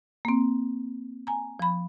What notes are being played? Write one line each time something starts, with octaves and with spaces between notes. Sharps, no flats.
A#3 C4
G#5 A#5
F3 B5